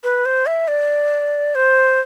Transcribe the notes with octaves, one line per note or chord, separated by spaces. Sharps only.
B4
C5
E5
D5
C5